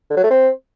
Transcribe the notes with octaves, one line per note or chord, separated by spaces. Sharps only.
D3
F#3
A3
C4